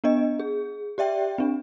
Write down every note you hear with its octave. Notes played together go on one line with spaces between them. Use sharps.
B3 D4 D#5
G#4
G4 D5 E5 G5
C4 D4